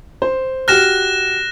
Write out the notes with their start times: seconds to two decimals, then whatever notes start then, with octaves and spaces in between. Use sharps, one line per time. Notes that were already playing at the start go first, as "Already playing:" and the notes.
0.22 C5
0.68 F#4 G4 F6 F#6 A#6 E7